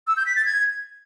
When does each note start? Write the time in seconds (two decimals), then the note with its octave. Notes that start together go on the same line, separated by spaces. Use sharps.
0.07 E6
0.17 G6
0.26 B6
0.36 A6
0.45 G#6